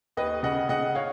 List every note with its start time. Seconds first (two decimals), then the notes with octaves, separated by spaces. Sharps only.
0.17 D#2 B4 D#5
0.43 C#3 D#5 F#5
0.69 C#3 D#5 F#5
0.95 C#5 F5